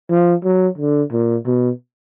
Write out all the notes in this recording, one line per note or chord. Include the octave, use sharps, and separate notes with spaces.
F3
F#3
D3
A#2
B2